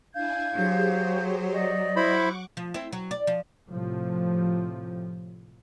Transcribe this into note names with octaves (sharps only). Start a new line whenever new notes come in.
D4 E4 F5 G#5 G6 G#6
F#3 G4 G#4 C5
D5 D#5
E4 C5 F#5 B5 C#6 D6
F3
C4 E4
F#3
D5
F3
A2 C3 F3